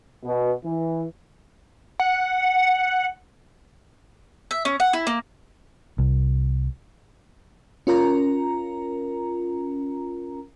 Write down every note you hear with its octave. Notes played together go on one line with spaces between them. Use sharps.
B2
E3
F#5
E5
C#4
F#5
E4
A#3
C2
C#4 F4 A#4 A#5